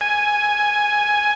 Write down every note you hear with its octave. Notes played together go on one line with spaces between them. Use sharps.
G#5